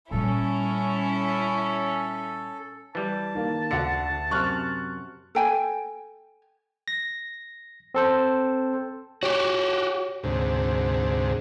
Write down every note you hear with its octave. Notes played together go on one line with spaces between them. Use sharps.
A#2 G3 C#4 E4 A4
E3 G3 A5
D#3 A#3
D2 D3 F#5 C#7
F#2 C3 C#6 F6 F#6
A4 G5 G#5
A#6
C4 A4 C5
F#4 G4 C#5
D2 G#2 C3